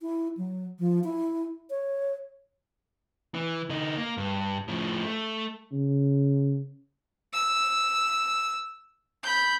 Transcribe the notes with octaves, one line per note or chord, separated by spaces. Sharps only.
E4
F#3
F3
E4
C#5
E3
D3 D#4
A#3
G2
A2 F3
A3
C#3
E6
B5 G6